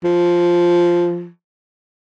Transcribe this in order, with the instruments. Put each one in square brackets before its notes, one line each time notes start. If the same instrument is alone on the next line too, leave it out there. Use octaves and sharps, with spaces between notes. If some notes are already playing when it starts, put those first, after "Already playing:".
[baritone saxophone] F3